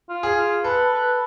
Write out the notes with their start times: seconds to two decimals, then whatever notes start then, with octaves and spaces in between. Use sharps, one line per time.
0.09 F4
0.23 G#4
0.37 F4
0.64 A4 B4
0.92 B4